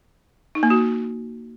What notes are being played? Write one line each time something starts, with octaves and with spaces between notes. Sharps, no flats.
D#4
A#3
F#4